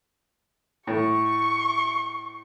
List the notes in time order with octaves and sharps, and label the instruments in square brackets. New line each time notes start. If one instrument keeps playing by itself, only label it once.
[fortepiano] A2 C#5 [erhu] C#6